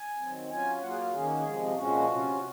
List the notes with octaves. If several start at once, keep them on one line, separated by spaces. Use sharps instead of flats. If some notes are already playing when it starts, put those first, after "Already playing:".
Already playing: G#5
D#3 F#3 C4
F#3 C#4 F4 G#5
F#3 A#3 F4 F#5
G#4
A#4
D#3 A#3 C#4 G#4
F#4
G#4
C3 F3 G#3
A#2 F3 G#3 C#4 F#4
C3 F#3 C#4 F4